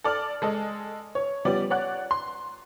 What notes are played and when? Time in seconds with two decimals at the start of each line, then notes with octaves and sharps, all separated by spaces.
0.04 A4 D5 F6
0.42 G#3 A4 D#5
1.15 C#5
1.45 F3 G3 B3 C#4 D5
1.70 C#5 D5 F#5 F#6
2.11 C6